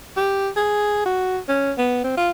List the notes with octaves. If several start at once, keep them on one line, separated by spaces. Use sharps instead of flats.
G4
G#4
F#4
C#4
B3
C4
F4